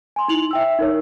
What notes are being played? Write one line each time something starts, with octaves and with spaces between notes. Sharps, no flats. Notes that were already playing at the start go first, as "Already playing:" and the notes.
G#5 C6
D#4 E4 F7 F#7
E5 G5 E6
D#4 A#4 C#5